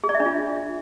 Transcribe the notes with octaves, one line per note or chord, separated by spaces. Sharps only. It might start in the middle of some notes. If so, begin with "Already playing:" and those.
G#4
D5
E5
D4
F4